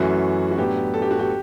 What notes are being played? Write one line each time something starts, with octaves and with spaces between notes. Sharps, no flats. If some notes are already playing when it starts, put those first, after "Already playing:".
Already playing: F#2 E3 A3 C#4 F#4
F#4
A2 F#3 B3 D4 G4
A4
G4
F#4
G4